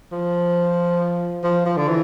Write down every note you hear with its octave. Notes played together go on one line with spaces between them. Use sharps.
F3
F3
F3
D3
E3